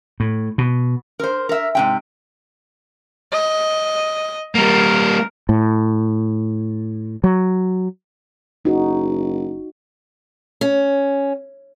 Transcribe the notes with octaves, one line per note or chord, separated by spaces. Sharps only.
A2
B2
A#4 C5
A#4 E5
G#2 C3 G5
D#5
G3 A#3 A#4
A2
F#3
F#1 D#4 F#4
C#4